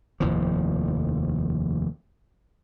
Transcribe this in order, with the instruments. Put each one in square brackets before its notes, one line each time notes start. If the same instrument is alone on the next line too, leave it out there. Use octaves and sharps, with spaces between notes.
[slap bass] F1 D#2 A2 F3